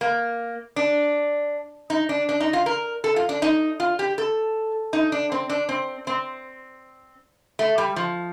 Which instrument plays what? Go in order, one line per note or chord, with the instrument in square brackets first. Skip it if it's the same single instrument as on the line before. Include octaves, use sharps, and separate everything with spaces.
[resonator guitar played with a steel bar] A#3
D4
D#4
D4
D4
D#4
F4
A#4
A4
F4
D4
D#4
F4
G4
A4
D#4
D4
C4
D4
C4
C4
A3
G3
F3